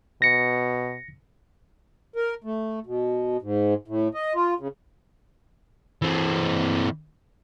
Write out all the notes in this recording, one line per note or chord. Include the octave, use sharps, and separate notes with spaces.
B2 A#6 C#7
A#4
A3
B2
G#2
A2
D#5
F4
C#3
E3 C4